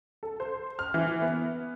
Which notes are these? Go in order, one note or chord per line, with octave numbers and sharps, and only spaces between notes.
A4
C5
F6
E3
B3